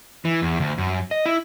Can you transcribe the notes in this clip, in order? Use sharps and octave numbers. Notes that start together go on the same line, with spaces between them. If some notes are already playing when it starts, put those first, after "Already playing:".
E3
E2
D2
F#2
D#5
E4